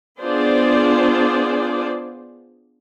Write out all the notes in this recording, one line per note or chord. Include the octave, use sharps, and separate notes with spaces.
B3 D4 F4 G#4 C5 D5